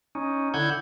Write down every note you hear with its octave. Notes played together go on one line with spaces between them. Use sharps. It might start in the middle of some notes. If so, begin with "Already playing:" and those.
C#4 D#4
D3 E4 F#5 G6 G#6